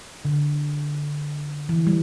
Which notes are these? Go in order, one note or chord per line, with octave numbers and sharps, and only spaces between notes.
D3
E3
G3